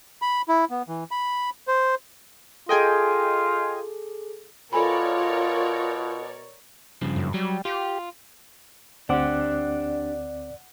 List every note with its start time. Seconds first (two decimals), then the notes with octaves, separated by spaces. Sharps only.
0.22 B5
0.48 E4
0.70 B3
0.88 E3
1.11 B5
1.68 C5
2.69 F4 G#4 A4 D#5 G5 G#5
4.73 B2 F4 A4 A#4 C#5 D5 G#5 B5
7.02 G2 C#3 F3
7.16 F#2
7.34 F#3 G3
7.65 F4 G4
9.09 D2 C4 D4 G4 D5 F#5 D6